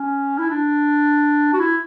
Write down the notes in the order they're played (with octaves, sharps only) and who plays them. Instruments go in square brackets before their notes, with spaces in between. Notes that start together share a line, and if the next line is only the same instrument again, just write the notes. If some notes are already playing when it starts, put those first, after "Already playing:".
Already playing: [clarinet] C#4
E4
D4
F#4
E4